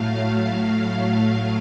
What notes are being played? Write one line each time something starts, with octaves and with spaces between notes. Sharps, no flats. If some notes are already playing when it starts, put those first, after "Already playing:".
Already playing: A2 F#3 A3 F5